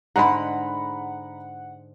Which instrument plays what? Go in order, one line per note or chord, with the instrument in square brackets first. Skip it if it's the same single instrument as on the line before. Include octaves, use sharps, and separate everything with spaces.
[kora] G#2 D3 G#3 [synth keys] F#5 [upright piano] A#5 B5